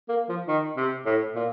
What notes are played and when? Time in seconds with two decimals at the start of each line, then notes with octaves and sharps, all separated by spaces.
0.09 A#3
0.29 F3
0.48 D#3
0.77 C3
1.06 A2
1.35 A#2